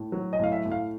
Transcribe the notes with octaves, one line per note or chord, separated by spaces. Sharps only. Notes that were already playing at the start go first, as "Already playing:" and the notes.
Already playing: A2
F#3
D#5
A2 F5
E5
A2
F5